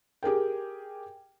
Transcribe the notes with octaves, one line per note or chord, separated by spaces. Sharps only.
G4 G#4 A#4 G5